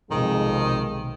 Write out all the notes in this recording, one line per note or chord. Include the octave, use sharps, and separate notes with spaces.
B1 F2 C3 D#3 G#3